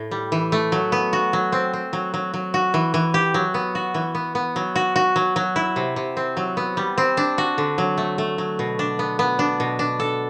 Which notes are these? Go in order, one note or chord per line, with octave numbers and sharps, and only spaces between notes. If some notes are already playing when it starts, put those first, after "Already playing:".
Already playing: A2
G3
E3
A3
F#3
B3
F#4
F#3
C4
C4
F#3
F#3
F#3
F#4
E3
E3
G4
F#3
B3
F#4
E3
B3
B3
F#3
F#4
F#4
F#3
F#3
E4
C3
C3
C4
F#3
B3
G3
C4
D4
F#4
D3
F#3
A3
A3
F#3
B2
D4
B3
B3
D4
B2
D4
A4